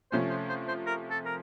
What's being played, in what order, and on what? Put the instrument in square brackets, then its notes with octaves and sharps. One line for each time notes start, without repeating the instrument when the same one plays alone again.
[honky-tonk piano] C3 F3 A3 C#4 [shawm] C5
[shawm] C5
C5
C5
A#4
A4
A#4